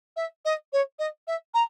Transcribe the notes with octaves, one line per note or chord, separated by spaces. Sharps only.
E5
D#5
C#5
D#5
E5
A#5